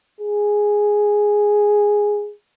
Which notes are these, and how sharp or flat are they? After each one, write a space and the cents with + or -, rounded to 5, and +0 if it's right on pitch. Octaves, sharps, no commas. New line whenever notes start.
G#4 +0